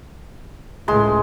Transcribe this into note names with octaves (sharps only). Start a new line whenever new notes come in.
C#2 A2 G#3 C6